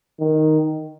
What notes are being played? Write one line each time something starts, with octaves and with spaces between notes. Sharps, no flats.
D#3